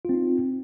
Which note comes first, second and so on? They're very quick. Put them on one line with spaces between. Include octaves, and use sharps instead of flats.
F4 C4 D#4